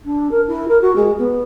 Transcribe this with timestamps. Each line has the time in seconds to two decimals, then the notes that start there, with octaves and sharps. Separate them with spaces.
0.04 D4
0.31 A#4
0.47 E4
0.68 A#4
0.81 F#4
0.95 G#3
1.18 B3